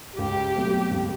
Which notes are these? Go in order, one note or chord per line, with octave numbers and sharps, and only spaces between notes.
C#2 G4
B2 F#3 A3 C4
C#2